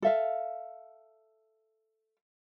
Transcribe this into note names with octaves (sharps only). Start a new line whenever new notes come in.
A4 E5 F5